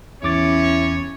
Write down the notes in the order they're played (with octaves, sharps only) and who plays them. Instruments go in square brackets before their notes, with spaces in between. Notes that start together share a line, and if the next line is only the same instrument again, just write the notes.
[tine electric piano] E2 D6 A6 [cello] C#4 [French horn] E4 [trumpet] C#5